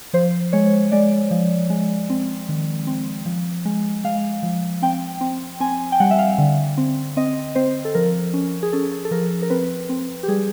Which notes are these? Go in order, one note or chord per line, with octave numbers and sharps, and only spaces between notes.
F3 C5
G#3 C#5
G#3 D5
F3
G#3
C4
D#3
C4
F3
G#3
G#3 F5
F3
C4 G5
C4
C4 G#5
G5
G3 F#5
E5
F5
D3
C4
C4 D#5
C4 C5
A4
F3 A#4
C#4
G#4
C#4 A4
A4
F3 A#4
A#4
C4 B4
C4
G4
G3 G#4